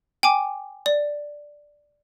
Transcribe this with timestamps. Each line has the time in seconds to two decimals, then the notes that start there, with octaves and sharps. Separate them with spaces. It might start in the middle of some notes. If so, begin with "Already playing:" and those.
0.23 G5 G#5 D6
0.86 D5